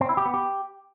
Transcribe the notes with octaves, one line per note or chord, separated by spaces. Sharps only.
C4
E4
G4
B3
G4